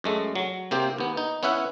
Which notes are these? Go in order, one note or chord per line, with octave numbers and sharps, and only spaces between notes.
F#2 G#3 A3
F#3
C3 A#3 C4 G4
D#2 B3
D#4
B3 C#4 E4 E5 F#5